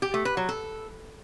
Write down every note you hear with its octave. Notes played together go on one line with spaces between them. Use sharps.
G4
A3
B4
F#3
A4